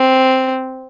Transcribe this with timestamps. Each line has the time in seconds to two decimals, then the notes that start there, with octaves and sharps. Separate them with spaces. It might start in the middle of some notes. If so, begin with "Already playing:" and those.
Already playing: C4